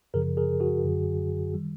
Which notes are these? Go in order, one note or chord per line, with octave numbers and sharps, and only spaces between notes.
F#2 C#3 F3 G#4 A#4
G#4 A#4
F#4 G#4
F#2 D3 F#3
D#3 G3